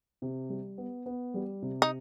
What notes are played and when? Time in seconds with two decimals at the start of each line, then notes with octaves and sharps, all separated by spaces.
0.22 C3
0.49 G3
0.78 B3
1.06 B3
1.34 G3
1.62 C3
1.82 D#4